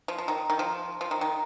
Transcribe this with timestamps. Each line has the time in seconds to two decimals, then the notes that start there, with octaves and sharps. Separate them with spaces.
0.08 F3
0.18 F3
0.28 D#3
0.50 D#3
0.59 F3
1.01 F3
1.11 D#3
1.21 D#3